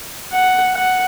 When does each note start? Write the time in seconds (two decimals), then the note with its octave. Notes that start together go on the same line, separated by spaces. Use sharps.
0.33 F#5
0.74 F#5